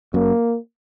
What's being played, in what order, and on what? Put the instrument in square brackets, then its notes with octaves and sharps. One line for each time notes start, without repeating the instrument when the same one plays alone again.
[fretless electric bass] F#2 [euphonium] A#3